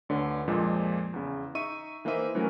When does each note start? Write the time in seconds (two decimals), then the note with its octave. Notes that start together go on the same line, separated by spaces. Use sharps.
0.09 D2 D3 B4 C#5
0.48 F2 A#2 F3 G#3
1.14 E2 C#3
1.55 D#4 E5 C#6 D#7
2.05 E3 A#3 D#4 C5 E5 D#7
2.35 E3 F#3 A3 C#4 A#4